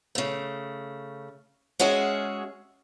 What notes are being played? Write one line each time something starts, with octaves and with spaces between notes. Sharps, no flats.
C#3 A3
G#3 C#4 F#4 G#4 E5